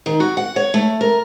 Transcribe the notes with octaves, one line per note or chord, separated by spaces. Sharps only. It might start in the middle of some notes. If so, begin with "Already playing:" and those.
D#3
F#4
F#5
C#5
A3
A#4